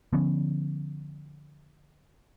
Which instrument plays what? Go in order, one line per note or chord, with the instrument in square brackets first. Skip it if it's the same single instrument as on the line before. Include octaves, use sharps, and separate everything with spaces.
[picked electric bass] D3 F3 B3 C#4